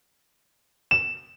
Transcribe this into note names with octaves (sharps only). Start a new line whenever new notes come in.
E7